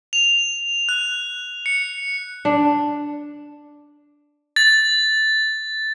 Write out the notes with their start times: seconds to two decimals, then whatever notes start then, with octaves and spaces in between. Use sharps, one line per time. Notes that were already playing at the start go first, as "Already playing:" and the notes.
0.13 F7
0.89 F#6
1.66 C#7
2.45 D4
4.56 A6